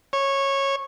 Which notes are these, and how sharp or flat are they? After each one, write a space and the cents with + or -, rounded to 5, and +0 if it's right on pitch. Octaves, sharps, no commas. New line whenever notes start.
C#5 -15